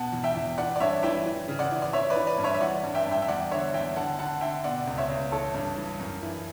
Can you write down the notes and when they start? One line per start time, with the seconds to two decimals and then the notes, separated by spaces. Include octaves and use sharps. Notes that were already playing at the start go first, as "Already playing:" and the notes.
Already playing: B2 F#5 A5
0.12 E2
0.24 E5 G5
0.35 E2
0.58 E3 D5 F#5
0.76 D5
0.80 G2 C#5 E5
1.03 E3 E5 G5
1.26 E3
1.48 C#3
1.59 D5 F#5
1.71 E3
1.82 D5
1.93 E3 C#5 E5
2.10 B4 D5
2.16 E3
2.27 B4 D5
2.38 G2
2.44 C#5 E5
2.55 E5
2.61 E3 D5 F#5
2.83 G2
2.95 E5 G5
3.07 G2 E5 G5
3.22 E5
3.28 E2 D5 F#5
3.51 D3 C#5 E5
3.74 E2 E5 G5
3.96 D3 F#5 A5
4.19 D3 F#5 A5
4.41 D3 E5 G5
4.64 B2 D5 F#5
4.87 C#2
4.98 C#5 E5
5.09 C#2
5.32 E3 A4 C#5
5.54 G2
5.77 E3
6.00 F#2
6.22 E3